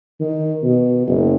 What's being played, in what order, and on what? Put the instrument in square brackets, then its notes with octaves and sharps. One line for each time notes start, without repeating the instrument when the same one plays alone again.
[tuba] D#3
B2
F#1